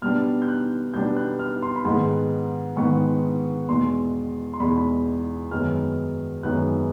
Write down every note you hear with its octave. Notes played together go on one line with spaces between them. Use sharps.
B2 G3 B3 D4 F6
G6
F#6
B2 G3 B3 D4 G6
F#6
F6
C6
B5
G#2 D#3 G#3 B3 C6
G#2 D#3 G#3 B3 C#6
E2 B2 G#3 C6
C6
E2 B2 G#3 B5
F#2 D#3 G#3 B3 F6
F#2 D#3 G#3 B3 F#6